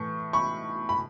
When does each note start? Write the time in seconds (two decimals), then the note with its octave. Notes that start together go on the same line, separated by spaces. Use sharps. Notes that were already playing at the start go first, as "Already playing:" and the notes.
Already playing: A2 E3 A3 C#6
0.33 B5 C#6
0.89 B5